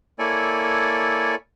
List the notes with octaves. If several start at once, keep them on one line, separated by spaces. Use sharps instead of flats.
A#3 E4 A4 C#5 D5 G#5